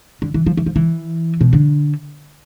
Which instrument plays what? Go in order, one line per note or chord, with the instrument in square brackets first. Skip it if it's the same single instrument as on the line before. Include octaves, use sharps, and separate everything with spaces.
[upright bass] D3
E3
F3
E3
F3
E3
B2
D3